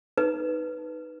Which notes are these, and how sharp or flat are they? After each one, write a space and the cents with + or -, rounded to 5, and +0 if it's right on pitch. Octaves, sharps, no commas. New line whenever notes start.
D#4 +0 B4 +0